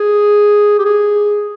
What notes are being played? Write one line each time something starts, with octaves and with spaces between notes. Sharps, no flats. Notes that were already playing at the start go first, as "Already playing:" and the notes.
Already playing: G#4
G4
G#4